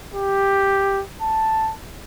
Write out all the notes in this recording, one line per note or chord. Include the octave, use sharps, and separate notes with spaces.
G4
A5